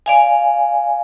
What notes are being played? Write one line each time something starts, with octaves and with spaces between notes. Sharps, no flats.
D5 F5 G#5